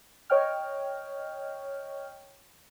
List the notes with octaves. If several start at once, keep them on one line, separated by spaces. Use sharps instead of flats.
C#5 D#5 G5 F6